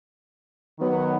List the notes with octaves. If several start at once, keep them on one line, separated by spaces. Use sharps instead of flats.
D#3 F#3 B3